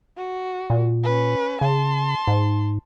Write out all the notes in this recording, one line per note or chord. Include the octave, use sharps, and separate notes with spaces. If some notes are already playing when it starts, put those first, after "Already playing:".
F#4
A#2
C#4 B4
C#3 A5 C6
G#2